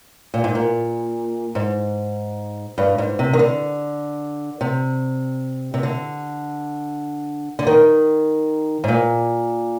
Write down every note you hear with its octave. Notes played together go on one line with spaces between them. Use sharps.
A#2
G#2
A#2
G#2
G2
G#2
C3
D#3
D3
C3
C3
D3
D3
D#3
G#2
A#2